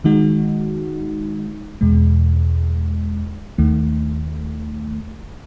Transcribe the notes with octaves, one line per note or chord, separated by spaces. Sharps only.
D#3 G#3 D#4 F#4
E2 B2 G#3
D#2 D#3 A3